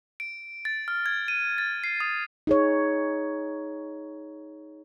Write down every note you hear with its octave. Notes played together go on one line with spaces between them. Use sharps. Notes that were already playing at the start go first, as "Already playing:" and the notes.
D7
A6
F6
G#6
D#7
A6
C7
D#6
D#4 G#4 C#5